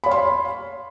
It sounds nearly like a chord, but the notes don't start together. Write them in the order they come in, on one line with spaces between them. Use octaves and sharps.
B5 C#5 F5 C6